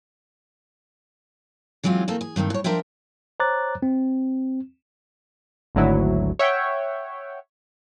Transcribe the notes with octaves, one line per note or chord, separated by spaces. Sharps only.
E3 F#3 G#3 B3 C4 F4
A3 A#3 C4 A4
G#4
G2 D#3 A3 C4
A2 C#5
F3 D4 A#4 C5 E5 G5
C5 C#5 A#5 D6 F#6 A6
C4
G#1 D2 F#3 E4
C#5 E5 F#5 G5